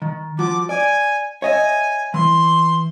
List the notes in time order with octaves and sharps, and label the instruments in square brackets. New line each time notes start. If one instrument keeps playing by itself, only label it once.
[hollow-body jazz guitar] D#3
[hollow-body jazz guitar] F3 F#4 [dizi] D6
[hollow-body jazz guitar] D5 [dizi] G#5
[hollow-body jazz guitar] C#5 D#5 E5 [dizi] G#5
[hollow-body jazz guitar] E3 [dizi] C6